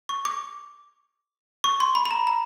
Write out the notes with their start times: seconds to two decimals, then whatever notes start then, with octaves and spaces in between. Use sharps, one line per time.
0.09 C#6
0.25 D6
1.64 C#6
1.80 C6
1.95 B5
2.05 B5
2.11 A#5
2.27 A#5